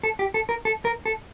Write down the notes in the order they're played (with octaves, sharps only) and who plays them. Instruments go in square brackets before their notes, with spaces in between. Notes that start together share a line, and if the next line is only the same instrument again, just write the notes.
[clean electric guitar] A4
G4
A4
A#4
A4
A#4
A4